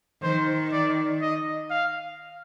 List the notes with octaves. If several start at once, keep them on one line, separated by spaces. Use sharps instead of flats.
D#3 C5
D5
D#5
F5